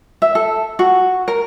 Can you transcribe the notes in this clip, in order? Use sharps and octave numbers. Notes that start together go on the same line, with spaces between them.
E5
A4
F#4
A#4